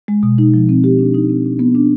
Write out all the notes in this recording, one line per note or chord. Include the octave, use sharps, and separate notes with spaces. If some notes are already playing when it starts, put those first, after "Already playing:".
G#3
B2
D#4
F3
C4
G4
D4
D#4
C4
D4
B3
D4